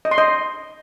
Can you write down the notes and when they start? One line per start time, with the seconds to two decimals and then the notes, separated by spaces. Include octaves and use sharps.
0.05 D#5
0.11 C6
0.18 D#5